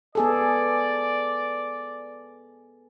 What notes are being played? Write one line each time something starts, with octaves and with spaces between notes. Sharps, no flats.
B3 G#4 A4 D5